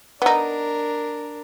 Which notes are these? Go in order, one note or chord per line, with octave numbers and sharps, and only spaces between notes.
B3 D4 D#4 A#4